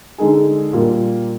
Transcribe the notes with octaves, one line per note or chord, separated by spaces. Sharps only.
D3 G#3 D#4 G#4
A#2 G3 A#3 F4